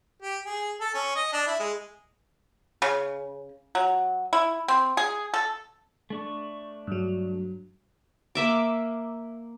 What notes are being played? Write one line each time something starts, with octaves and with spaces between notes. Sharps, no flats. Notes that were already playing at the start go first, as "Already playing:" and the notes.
G4
G#4
A4
C#4
D#5
D4
E4
G#3
C#3
F#3
E4
C4
G#4
A4
A3 D4 C#6
G2 F#3
A#3 E5 D6